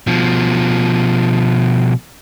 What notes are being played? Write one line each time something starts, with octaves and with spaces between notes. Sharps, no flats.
B2 F3